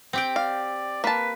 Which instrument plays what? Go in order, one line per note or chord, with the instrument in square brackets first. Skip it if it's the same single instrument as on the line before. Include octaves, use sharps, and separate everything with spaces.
[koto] C4 G4 G5
[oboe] D5 [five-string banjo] F5
[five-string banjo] A#3 A5 [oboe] B4